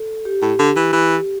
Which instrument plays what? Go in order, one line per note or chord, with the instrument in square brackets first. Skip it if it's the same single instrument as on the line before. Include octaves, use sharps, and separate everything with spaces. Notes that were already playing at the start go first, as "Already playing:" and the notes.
Already playing: [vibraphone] A4
G4
[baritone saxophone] A2
D3
E3
E3